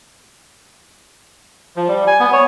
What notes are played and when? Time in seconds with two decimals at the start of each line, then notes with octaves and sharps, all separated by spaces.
1.76 F3
1.88 G3
2.07 G#5
2.20 B3
2.33 C#5